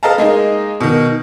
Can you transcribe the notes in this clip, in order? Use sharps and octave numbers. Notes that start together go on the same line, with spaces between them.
A4 B4 D#5 F5 A5 A#5
G#3 A#3 D#4
B2 D#3